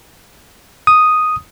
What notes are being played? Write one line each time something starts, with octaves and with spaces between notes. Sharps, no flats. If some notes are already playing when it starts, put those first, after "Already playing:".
D#6